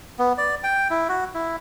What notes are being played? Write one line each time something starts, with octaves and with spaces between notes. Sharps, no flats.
B3
D5
G5
E4
F#4
E4